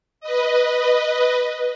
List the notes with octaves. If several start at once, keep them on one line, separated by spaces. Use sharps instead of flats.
B4 D#5